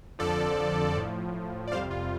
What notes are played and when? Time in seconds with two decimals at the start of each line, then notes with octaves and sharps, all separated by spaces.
0.19 F2 D3 F3 A4 D5
0.95 A2 F3
1.67 D5
1.72 F2 C3 G3 C5 F5
1.91 F4